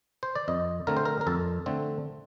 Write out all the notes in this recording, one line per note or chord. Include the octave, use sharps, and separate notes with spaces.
C5
D5
F2 D#5
D3 A3 C4 A#4
C5
A#4
A#4
F2 A4
D3 A3 C4